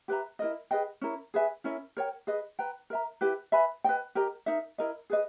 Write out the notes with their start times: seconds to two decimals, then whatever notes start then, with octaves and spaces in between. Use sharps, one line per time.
0.08 G4 B4 E5 A#5
0.39 E4 A#4 D#5
0.71 G#4 B4 D#5 G5
1.01 C#4 E4 A#4
1.34 G#4 B4 E5 G#5
1.64 C#4 E4 A#4 E5
1.97 A#4 C#5 G5
2.27 G#4 B4 D#5
2.59 B4 G5 A#5
2.90 A#4 E5 A#5
3.21 E4 G4 B4 E5
3.52 B4 E5 G#5 B5
3.84 B4 D#5 G5
4.15 G4 A#4 D#5 A#5
4.46 D#4 A#4 E5
4.78 E4 A#4 D#5
5.10 G#4 B4 D#5